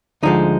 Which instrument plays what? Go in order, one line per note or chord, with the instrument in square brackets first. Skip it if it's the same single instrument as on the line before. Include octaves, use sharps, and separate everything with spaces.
[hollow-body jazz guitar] D2 D3 F3 G#3 D#4